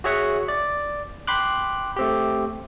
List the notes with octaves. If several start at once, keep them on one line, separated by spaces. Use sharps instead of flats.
F#4 G#4 C#5 E5 F#5
D5
G5 B5 C6 D6 F#6
A3 C4 G4